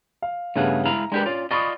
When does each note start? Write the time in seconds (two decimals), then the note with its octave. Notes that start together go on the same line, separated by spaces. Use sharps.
0.22 F5
0.56 G2 C#3 A3 B3 G#4 F#5
0.86 G#3 E4 F5 A#5
1.12 G#3 D4 G4 A#4 B4
1.26 C#4 F4 D5
1.51 F4 D5 D#5 B5 C#6 D#6